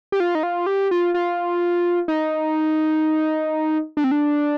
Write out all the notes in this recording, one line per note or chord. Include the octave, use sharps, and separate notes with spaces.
G4
F4
D#4
F4
G4
F4
F4
D#4
D4
C4
D4